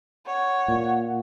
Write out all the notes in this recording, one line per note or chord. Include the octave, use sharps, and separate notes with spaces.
C#5 F#5
A#2